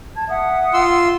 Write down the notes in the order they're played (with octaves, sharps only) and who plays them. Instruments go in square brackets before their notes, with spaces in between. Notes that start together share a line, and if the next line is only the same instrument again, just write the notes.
[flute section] A5 G#6
E5 F#5 D#6
[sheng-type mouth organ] F4 C6 E6